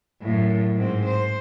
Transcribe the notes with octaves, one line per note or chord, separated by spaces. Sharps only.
F#2 A2
G#2 C4
C5